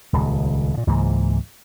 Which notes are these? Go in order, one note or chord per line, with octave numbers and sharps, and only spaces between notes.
D#1 C#2
A#2 C#3
C#2 G#2 E3 A#3